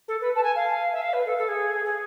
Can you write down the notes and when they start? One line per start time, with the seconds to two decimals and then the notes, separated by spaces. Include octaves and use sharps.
0.08 A4
0.21 B4
0.36 A5
0.43 G#5
0.56 F5
0.92 E5
1.02 F5
1.13 B4
1.25 A4
1.38 A4
1.48 G#4
1.85 G#4